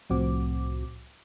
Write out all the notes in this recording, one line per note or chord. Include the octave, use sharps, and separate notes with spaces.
C2 A2 F3 C4 F#4 D6